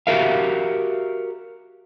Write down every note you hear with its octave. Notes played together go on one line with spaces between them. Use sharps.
F#4 G4 A#4 E5 F5